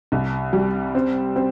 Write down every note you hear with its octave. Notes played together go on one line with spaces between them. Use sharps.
C2
G3
C4
C4